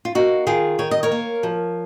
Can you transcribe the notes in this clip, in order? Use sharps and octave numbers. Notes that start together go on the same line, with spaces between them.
F4
A#3 D#4 F#4
D#3 F4 G#4
D#3 C#5
D#5
A#4 C#5
A#3
F3